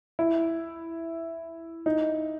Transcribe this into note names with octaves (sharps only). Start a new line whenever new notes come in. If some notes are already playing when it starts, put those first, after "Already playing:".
E4
D#4